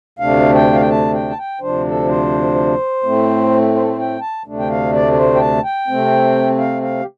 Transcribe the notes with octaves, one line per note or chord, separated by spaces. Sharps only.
D2 C3 A3 D4 F5
G5
F5
G5
A5
G5
A5
G5
D2 C3 F3 D4 C5
A4
C5
A2 A3 C4
C5
A4
C5
G5
A5
D2 C3 A3 D4
G5
F5
D5
D5
C5
G5
A5
G5
C3 A3 C4
F5
F5
G4